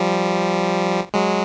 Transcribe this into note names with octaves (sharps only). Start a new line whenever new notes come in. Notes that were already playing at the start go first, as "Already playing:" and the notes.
Already playing: F3 G3
F#3 G#3